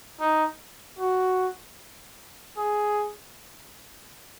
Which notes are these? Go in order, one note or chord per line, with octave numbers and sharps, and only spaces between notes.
D#4
F#4
G#4